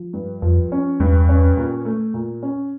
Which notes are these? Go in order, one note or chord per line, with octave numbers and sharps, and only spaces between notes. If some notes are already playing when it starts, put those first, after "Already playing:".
Already playing: F3
G2
F2 F3
C#4
E2 G2
C#4
A#2
A3
A#2
C#4